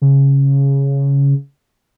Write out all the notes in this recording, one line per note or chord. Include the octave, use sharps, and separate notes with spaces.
C#3